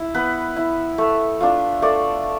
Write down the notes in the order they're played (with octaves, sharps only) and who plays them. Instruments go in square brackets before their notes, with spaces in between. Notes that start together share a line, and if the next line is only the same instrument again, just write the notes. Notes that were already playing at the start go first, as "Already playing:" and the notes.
Already playing: [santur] E4
B3 B4
E4
A3
D4 F4
A3 D5